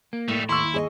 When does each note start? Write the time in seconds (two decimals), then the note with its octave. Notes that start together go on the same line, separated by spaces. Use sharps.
0.13 A#3
0.28 A2 G3 A3
0.49 D#2 E4 C6 C#6 E6
0.74 G#4 D5 D#5